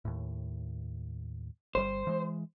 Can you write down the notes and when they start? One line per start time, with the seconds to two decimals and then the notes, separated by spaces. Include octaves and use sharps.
0.05 D#2 A2
1.75 G1 G3 C5
2.07 E3 G#3